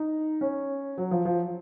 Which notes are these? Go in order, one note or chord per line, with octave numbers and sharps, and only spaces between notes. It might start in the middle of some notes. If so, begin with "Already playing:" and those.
Already playing: D#4
C#4
F#3
F3
F3